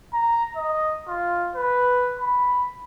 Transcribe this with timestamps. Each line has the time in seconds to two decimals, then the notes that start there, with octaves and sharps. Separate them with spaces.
0.13 A#5
0.57 D#5
1.08 F4
1.56 B4
2.19 B5